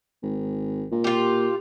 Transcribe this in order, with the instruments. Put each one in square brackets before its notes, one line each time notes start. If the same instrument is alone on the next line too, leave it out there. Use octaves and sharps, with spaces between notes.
[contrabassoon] G#1
A#2
[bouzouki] F4 G4